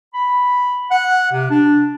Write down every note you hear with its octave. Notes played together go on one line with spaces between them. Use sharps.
B5
F#5
C3
D4